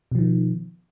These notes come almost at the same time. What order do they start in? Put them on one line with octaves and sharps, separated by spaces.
B2 F3 D#3